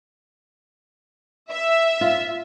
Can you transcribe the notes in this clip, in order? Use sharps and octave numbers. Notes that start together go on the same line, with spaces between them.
E5
F4